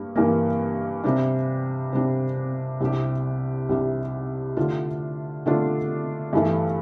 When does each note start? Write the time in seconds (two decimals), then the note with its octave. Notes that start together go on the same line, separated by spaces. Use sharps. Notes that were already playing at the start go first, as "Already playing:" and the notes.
Already playing: G2 A#3
0.16 G2 E3 A#3
1.04 C3 G3 D4
1.93 C3 G3 D4
2.80 C2 C3 G3 D4 G4
3.69 C2 C3 G3 D4 G4
4.57 D3 A3 D4 F4
5.46 D3 A3 D4 F4
6.33 G2 E3 A3